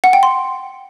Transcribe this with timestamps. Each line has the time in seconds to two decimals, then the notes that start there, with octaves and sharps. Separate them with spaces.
0.04 F#5
0.13 G5
0.23 C6